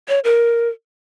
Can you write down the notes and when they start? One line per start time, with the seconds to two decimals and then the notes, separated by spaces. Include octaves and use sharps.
0.08 C#5
0.24 A#4